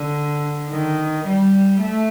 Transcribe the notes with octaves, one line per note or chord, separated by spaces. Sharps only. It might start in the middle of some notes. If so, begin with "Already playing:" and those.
Already playing: D3
D#3
G3
A3